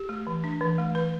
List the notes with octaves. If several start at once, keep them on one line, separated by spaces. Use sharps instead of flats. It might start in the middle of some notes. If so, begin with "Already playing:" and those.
Already playing: G4
A3
E3
D4
E3
A3
E3 B4